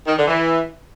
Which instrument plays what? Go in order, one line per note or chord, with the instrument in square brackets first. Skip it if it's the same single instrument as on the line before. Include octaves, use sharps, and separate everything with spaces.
[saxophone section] D#3
D3
E3